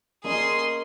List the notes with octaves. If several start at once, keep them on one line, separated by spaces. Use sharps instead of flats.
A#3 C#4 G#4 D#5 C6